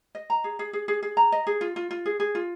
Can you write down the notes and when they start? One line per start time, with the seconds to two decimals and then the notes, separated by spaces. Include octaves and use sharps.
0.15 D#5
0.30 A#5
0.44 G#4
0.59 G#4
0.73 G#4
0.88 G#4
1.03 G#4
1.17 A#5
1.32 D#5
1.47 G#4
1.61 F4
1.76 F4
1.91 F4
2.06 G#4
2.20 G#4
2.35 F4